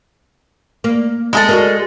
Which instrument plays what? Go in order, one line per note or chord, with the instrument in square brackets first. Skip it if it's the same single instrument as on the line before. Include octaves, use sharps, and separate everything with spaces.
[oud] A#3
[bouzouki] G#3 G#4 A4
[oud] F#4 G4 A#4